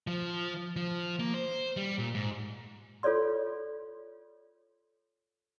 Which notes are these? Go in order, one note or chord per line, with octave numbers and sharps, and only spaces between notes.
F3
F3
A#3
C5
G3
A#2
G#2
F4 A4 C#5 D5 C6